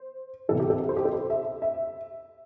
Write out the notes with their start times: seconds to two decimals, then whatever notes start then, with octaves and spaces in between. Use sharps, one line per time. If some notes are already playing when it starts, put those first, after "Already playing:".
Already playing: C5
0.48 C2 C3 E3 A4
0.60 G4
0.70 A4
0.89 C5
0.97 G4
1.05 A4
1.13 C5
1.30 E5
1.62 E5